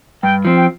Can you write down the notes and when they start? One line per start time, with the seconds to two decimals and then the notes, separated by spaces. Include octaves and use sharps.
0.23 G2 G5
0.45 F3 C4
0.57 G5